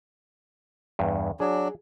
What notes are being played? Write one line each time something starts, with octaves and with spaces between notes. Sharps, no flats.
E2 G2
F#3 D4 G#4